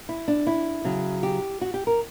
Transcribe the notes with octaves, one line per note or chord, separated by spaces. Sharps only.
E4
D4
E4
C#3 F#3
G4
F#4
G4
A#4